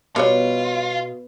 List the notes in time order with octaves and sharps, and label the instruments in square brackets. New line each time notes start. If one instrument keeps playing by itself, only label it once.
[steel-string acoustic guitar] B2 [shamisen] G3 C5 C#5 [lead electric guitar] F4